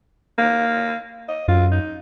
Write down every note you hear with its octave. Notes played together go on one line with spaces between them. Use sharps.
A#3
D#5
F#2 F4
D#4